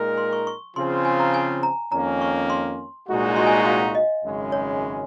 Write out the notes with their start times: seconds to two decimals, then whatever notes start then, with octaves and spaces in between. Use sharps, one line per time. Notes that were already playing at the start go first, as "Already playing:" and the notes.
Already playing: A#2 G#3 D#4 A#4
0.18 C6
0.33 C#6
0.47 C#6
0.76 C#3 F3 C4 F4 G#4 C6
1.05 G#5
1.20 A#5
1.34 G#5
1.63 A#5
1.92 F2 D#3 A#3 C#4 A#5
2.21 C#6
2.50 C6
3.07 C2 A#2 G#3 D#4 F#4
3.36 C6
3.47 G#5
3.56 F#5
3.66 F5
3.80 F5
3.95 D#5
4.24 G#1 F#2 C#3 G#3 C#4
4.52 C#5